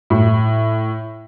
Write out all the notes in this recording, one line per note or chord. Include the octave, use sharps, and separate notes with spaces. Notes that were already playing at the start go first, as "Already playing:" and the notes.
A2